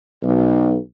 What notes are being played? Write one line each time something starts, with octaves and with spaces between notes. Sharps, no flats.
B1